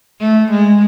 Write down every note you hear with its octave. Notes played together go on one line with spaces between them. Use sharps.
A3
G#3